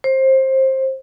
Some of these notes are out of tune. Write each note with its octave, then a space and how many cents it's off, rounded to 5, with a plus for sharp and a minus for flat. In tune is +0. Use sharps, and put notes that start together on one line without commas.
C5 +20